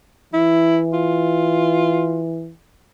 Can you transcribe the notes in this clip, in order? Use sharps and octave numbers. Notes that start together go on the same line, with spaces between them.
E3 E4
F4